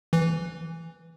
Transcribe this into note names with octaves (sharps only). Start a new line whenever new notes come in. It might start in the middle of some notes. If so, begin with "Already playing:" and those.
E3